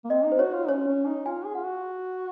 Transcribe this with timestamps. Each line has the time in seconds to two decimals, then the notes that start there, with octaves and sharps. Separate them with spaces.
0.05 A#3
0.10 C4 D#5
0.24 D#4
0.32 C5
0.39 F#4 C#5
0.54 F4
0.68 C#4 C#5
0.88 C#4
1.07 D#4
1.26 F4 G#5
1.45 G#4
1.55 F4 F#5
1.65 F#4